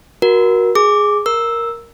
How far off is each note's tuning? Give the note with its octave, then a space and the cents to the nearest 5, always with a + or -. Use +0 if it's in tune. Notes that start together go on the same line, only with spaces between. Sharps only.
F#4 +0 A#4 +25
G#4 +0 D6 +0
A#4 +0 E6 +0